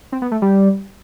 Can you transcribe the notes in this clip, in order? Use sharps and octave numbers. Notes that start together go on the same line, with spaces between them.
C4
B3
A3
G3